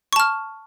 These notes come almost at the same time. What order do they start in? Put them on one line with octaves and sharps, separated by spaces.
C#6 A5 F6